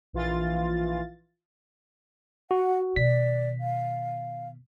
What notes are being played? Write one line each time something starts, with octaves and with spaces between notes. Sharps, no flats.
A#1 E3 F4 A6
F#4 F#5
B2 D#3 D5 B6
F5